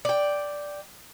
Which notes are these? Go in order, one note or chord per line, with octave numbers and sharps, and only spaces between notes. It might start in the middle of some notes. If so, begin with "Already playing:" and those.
D5 G5